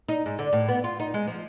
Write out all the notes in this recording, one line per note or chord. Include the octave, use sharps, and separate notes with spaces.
D#4
G#2
D3
A2
B3
F4
D#4
G#3
F3